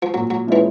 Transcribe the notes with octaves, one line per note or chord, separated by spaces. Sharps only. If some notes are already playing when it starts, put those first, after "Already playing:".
F3
A#2 F#3
F#3
E3 F3 G#3 C#4 E4